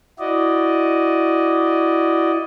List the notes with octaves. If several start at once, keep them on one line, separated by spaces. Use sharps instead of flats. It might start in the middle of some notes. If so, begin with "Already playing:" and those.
E4 F#4 D5 D#5